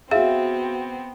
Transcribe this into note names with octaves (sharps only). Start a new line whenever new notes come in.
B3 C4 F#4 G#4 E5 F5